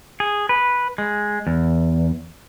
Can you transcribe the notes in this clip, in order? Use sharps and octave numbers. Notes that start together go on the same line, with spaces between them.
G#4
B4
G#3
E2